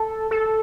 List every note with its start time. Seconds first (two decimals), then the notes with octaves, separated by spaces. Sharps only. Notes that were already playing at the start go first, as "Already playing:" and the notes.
Already playing: A4
0.31 A4